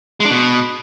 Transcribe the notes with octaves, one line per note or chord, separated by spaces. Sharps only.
G#3
D4
B2